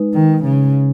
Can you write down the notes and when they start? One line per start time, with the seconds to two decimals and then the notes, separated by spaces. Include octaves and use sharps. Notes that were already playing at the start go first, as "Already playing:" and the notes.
Already playing: G#3 D#4 B4
0.14 D#3
0.44 C#3